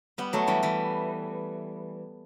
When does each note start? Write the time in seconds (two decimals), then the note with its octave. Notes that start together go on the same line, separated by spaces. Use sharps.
0.18 G3 B3
0.33 F#3 A3
0.47 E3 G3
0.63 E3 G3